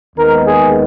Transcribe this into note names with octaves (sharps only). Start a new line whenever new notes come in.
D#2 D#3 G#3 B3 A#4
G#4